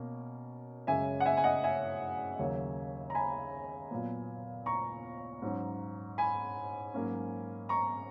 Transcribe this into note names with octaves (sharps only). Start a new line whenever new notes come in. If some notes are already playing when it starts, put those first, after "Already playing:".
Already playing: B2 A#3 C#4
F#2 C#3 G#3 E5 G#5
F#5
E5 G#5
G#5
D#5 F#5
E5 G#5
D#2 C#3 F#3 A#3
A#5
G#5 B5
A#2 F#3 B3
A#5 C#6
G#2 F#3 C#4
G#5 B5
G#2 F#3 A#3 C#4
A#5 C#6